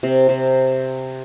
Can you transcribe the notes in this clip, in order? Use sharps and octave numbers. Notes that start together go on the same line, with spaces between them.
C3
C3